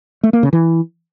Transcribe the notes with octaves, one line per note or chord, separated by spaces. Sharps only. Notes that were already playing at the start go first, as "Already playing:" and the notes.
A3
A#3
C#3
E3